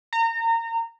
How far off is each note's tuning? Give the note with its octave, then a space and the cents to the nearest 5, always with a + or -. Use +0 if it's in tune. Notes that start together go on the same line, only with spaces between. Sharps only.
A#5 -25